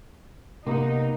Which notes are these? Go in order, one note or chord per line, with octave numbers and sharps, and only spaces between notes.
C3 A#3 B3 D#4